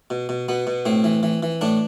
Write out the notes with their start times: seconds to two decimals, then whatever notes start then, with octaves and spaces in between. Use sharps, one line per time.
0.10 B2
0.29 B2
0.48 B2 B3
0.67 B2
0.86 A2 C4
1.04 E3
1.23 E3
1.43 E3
1.61 A2 D4